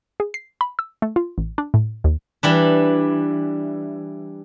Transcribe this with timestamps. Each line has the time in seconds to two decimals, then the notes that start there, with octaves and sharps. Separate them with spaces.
0.20 G#4
0.34 C7
0.61 B5
0.79 E6
1.02 A3
1.16 F4
1.38 A1
1.58 D4
1.74 A2
2.04 D#2
2.43 E3 G3 D4